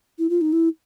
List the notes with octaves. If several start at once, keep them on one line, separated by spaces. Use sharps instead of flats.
E4
F4
D#4
E4